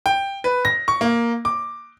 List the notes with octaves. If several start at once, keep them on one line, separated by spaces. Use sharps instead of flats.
G5
B4
A#6
C#6
A#3
D6